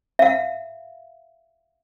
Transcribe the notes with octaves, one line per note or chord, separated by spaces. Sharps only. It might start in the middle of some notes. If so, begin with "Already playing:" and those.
E5 F5